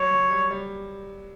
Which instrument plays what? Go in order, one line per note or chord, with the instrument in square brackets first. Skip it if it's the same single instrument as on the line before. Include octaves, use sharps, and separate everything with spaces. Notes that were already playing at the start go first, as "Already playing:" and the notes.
Already playing: [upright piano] F#3 [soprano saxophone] C#5
[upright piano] F#3
G3
G3